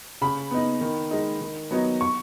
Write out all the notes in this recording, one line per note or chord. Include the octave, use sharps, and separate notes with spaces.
C#3 B5
B3 D#4
D#3
G#3 D#4
D#3
F#3 B3 D#4
C#6